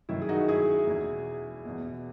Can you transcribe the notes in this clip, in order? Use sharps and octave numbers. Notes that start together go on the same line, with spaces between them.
F#2 D#3 E4
G#4
D#4 F#4
E4 G#4
E2 B2
E2 B2